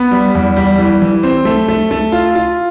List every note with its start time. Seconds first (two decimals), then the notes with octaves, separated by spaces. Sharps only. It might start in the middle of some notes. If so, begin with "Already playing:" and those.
Already playing: B3
0.11 G3
0.35 E2
0.56 G3
0.79 E3
1.02 E3
1.23 C4
1.45 A3
1.68 A3
1.91 A3
2.12 F4
2.35 F4